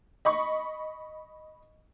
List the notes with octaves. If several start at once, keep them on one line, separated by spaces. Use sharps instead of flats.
D#5 B5 C#6